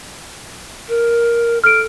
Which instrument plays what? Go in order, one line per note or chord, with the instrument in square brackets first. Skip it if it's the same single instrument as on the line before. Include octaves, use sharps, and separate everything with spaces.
[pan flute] A#4
[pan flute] A4 [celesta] F6 D7